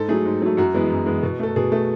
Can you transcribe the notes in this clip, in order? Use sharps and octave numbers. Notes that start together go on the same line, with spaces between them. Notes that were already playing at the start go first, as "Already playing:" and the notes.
Already playing: G#2 A4
F#3 A3 G#4
G#2
F#3 A3
F#2 F#4
E3 G#3 B3
F#2
E3 G#3 B3
B2
A3 A4
B2 G#4
A3 A4